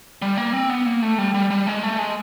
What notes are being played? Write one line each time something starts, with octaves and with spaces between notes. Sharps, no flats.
G3
A#3
C4
B3
A#3
A3
G3
G3
G3
G#3
A3
G#3